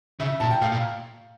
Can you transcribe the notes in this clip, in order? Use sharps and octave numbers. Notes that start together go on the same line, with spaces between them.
C#3 E5
A#2 A5
G5
A2 F5
A#2